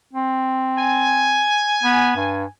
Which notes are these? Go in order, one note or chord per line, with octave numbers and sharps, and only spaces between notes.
C4
G#5
B3
G2